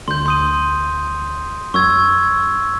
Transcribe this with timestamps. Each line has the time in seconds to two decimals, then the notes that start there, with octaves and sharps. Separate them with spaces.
0.08 D2 C6 G6
0.26 C6 D#6 D#7
1.74 F#2 C#6 E6 G#6